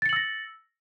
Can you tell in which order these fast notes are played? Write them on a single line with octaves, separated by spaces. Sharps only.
A6 C#7 F#7 E6 A#6